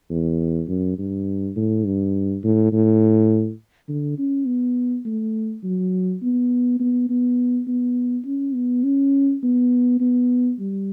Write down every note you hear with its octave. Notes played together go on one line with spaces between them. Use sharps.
E2
F#2
G2
A2
G2
A2
A2
D3
C#4
B3
A3
F#3
B3
B3
B3
B3
C#4
B3
C#4
B3
B3
G3